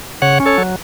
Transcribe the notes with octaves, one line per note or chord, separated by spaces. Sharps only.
C#3 C#5 F#5
C#4
A4 C#5
F#3